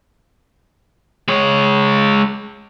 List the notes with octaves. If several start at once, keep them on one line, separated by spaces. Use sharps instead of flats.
G#3 C#5